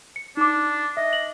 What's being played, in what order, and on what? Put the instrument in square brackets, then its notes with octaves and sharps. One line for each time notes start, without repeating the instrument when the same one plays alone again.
[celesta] C#7
[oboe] D4 [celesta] D#4 D6
[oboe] D#5 [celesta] E5
[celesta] F#7